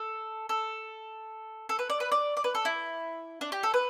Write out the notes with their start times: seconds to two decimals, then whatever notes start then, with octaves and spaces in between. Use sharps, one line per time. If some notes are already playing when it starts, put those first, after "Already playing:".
Already playing: A4
0.49 A4
1.69 A4
1.79 B4
1.90 D5
2.00 B4
2.12 D5
2.37 D5
2.44 B4
2.55 A4
2.65 E4
3.41 D4
3.52 G4
3.63 A4
3.74 B4